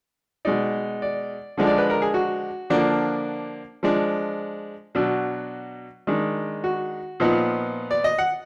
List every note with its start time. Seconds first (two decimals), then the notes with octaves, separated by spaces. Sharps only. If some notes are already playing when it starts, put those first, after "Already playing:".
0.45 B2 G#3 D#4 D5
1.02 D5
1.57 D3 F3 G#3 D4
1.67 D5
1.78 B4
1.90 A#4
2.02 G#4
2.14 F#4
2.70 D3 F3 A#3 D4
3.83 F3 G#3 D4
4.95 B2 F#3 D4
6.07 D#3 G#3 D4
6.64 F#4
7.20 A#2 F3 B3 D#4
7.91 D5
8.04 D#5
8.18 F#5